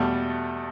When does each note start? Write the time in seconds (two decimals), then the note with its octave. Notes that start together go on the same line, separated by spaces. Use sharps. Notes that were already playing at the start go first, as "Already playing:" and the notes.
Already playing: E2 B2 G3 A3